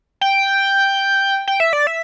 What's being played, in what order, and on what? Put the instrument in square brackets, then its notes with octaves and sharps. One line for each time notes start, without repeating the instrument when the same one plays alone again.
[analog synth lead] G5
G5
E5
D5
E5